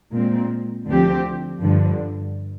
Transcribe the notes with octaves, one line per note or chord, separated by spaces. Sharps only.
A#2 G#3 C4
D2 D3 F3 C4 G4
G2 D3 F3